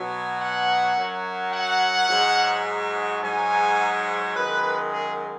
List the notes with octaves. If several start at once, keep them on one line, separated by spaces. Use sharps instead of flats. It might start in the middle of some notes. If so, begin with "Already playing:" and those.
Already playing: B2 F#3
F#5
F#2 F#3
F#5
G#2 F#3
G#2 F#3 G#5
F#2 D#3 G#3 B4
G#4